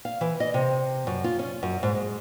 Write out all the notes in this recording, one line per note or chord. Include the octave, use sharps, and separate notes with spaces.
F5
E3
D#5
C3
F#2
F4
C#4
F#2
G#2
G#3